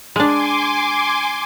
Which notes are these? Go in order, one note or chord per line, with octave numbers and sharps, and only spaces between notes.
G#3 D4 G#5 C6 D6